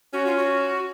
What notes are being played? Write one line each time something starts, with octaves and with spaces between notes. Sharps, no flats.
C#4 F#4
F4
F#4